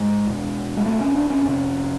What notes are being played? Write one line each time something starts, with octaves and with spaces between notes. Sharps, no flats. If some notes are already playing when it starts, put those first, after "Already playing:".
Already playing: G#2 G#3
E2 B2
G#3
A3
C#4
D4
C#4
F2 C3 C#4